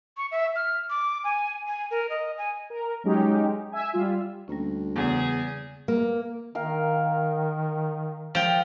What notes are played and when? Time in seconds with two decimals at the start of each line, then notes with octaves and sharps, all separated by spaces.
0.17 C#6
0.31 E5
0.56 F6
0.90 D6
1.24 G#5
1.68 G#5
1.91 A#4
2.10 D#5
2.38 G#5
2.70 A#4
3.04 F#3 G#3 C#4 D#4 G4
3.72 E5 G#5
3.93 G3 F4
4.48 D2 G3 A#3 C#4
4.96 E2 C#3 G#4
5.88 A#3
6.55 D#3 A#4 F5 G5
8.35 F3 G5